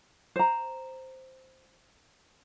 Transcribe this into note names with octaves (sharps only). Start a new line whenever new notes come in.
C5 A#5